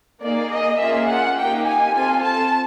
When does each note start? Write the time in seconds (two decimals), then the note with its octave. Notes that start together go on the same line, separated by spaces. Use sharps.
0.21 A#3 D#4 G#4 D5
0.50 D#5
0.79 A#3 C#4 F4 G#4 E5
1.07 F#5
1.36 A#3 D#4 G4 G5
1.65 G#5
1.94 C4 F4 A4 G#5
2.22 A5